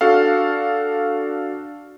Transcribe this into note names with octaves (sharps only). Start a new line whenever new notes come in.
D4 F#4 A4 F5